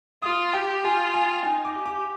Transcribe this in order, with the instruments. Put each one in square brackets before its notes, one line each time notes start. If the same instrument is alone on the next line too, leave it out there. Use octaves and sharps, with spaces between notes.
[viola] F4 [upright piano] D#6
[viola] G4 [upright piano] G5
[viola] F4 [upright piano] G#5
[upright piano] G#5
[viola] D#4 [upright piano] G#5
[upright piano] D6
[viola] G4
[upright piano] D6